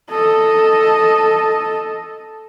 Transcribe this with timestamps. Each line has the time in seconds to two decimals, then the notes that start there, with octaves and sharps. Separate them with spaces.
0.10 A4 D#5